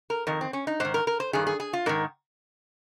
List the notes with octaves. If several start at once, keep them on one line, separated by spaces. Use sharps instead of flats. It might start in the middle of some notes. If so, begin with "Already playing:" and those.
A#4
F2 D#3 A#4
C4
C#4
D#4
G#2 D#3 C5
A#4
A#4
C5
G2 D#3 G#4
G#4
G#4
F4
G#2 D#3 A#4